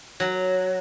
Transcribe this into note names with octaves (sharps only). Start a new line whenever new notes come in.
F#3